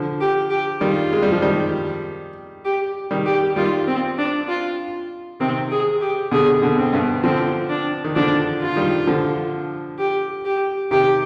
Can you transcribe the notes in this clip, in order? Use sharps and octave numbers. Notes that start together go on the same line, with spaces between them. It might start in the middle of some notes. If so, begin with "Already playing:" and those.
Already playing: D3 F3
G4
G4
D#3 G3 F4
G#3
G3
F3 G#3
D#3 G3
G4
D#3 G3
G4
D#3 G3 F4
C4
D4
F4
C3 D#3 C4
G#4
G4
B2 D3 G#4
B2 D3
C4
G2 B2
D3 F3 C4
D4
D#3
D3 F3 D4
F4
D#3 G3
D3 F3
G4
G4
C3 D#3 G4